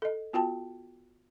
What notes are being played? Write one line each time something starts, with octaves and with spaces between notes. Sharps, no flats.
A4 D#5
B3 F4 F#4 G5 A5